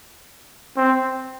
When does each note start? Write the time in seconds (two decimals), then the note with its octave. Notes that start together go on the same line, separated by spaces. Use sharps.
0.77 C4